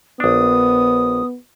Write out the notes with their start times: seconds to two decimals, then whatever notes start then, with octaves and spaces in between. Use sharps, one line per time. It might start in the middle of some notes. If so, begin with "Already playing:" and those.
0.20 A#1 B3 D4 D#6